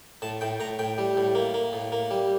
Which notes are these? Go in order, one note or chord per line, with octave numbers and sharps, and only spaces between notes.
A2 A5
A2 G5
A2 A#5
A2 G5
G3
A2
A#3
A#3
A2
A#3
G3